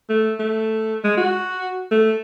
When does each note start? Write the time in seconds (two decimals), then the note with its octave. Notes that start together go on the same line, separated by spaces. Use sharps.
0.09 A3
0.39 A3
1.04 G#3
1.17 F#4
1.91 A3